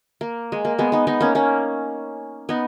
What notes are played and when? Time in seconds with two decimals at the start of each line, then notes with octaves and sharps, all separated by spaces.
0.21 A#3
0.52 G#3
0.65 A#3
0.79 G#3 B3
0.92 B3 D#4
1.07 B3 D#4
1.21 A#3 C#4
1.35 A#3 C#4
2.49 B3 D#4